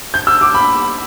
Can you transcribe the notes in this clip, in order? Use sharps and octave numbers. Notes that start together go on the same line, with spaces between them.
G6
E6
D6
B5